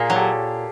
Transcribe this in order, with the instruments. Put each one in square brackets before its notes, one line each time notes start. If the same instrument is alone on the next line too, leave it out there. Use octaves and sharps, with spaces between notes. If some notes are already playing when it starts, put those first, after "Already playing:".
Already playing: [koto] A#2 [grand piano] G#4 A#4
[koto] F#3
[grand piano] G4 A4